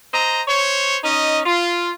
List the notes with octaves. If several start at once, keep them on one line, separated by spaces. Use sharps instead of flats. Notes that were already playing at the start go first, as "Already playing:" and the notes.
C5 D#5 A#5
C5 C#5
C#4 D#4 D#5
F4